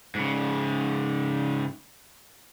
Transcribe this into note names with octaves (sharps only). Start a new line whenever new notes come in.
G#2 C#3